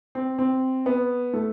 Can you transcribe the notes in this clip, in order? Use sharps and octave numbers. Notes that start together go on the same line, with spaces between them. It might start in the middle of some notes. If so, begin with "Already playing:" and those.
C4
C4
B3
A3